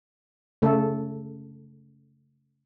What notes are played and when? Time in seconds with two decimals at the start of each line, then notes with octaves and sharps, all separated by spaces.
0.62 C#3 A3 A4